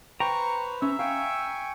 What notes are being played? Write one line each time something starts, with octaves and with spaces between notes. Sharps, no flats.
B4 C5 G5 A#5 C#6
C#4 E5
F5 G5 G#5 C#6